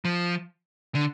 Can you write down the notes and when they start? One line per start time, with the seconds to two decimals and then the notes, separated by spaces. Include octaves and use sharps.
0.05 F3
0.95 D3